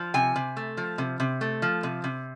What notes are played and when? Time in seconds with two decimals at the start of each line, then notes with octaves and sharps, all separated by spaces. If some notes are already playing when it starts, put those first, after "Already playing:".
Already playing: F3
0.14 C3 G#5
0.36 C3
0.57 A3
0.77 F3
0.98 C3
1.20 C3
1.41 A3
1.62 F3
1.83 C3
2.04 C3